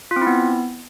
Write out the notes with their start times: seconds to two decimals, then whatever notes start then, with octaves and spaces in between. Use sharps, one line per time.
0.11 F4
0.16 C4
0.21 E4
0.27 B3